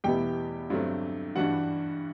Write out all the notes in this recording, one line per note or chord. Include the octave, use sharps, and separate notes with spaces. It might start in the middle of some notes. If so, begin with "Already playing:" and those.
E2 B2 G3 B3 E4 G4 G5
G2 D3 F#3 A3 C4
G2 E3 G3 D4 F#4 F#5